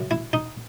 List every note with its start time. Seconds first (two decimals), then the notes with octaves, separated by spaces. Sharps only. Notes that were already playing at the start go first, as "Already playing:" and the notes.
Already playing: F#2 C#3
0.11 E4
0.33 D#4